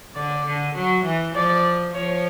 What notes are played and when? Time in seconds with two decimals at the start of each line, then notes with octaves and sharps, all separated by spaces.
0.15 D3 D5
0.46 D3
0.75 F#3
1.05 E3
1.35 F3 D5
1.94 F3 C#5